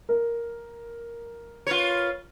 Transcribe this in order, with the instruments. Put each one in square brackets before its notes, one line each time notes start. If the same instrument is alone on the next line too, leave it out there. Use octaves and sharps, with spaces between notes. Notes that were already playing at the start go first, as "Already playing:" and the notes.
[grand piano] A#4
[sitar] F4 B4 C#5